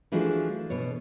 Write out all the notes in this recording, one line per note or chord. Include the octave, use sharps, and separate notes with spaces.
E3 F3 A3 D4 F#4 G#4
B2 C#5